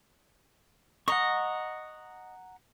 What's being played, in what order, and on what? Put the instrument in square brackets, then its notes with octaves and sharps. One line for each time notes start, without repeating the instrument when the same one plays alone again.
[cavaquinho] D#5 [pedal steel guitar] F#5 A#5 C#6